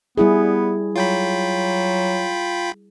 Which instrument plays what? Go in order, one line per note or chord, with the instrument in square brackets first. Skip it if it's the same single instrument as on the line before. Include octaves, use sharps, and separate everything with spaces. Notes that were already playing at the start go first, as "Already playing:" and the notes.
[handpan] G3 E4 G#4 [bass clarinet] B3
[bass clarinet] F#3 [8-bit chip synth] F4 G5 B5